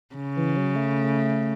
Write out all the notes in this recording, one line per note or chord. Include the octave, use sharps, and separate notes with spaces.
C#3
E3
F#3
A3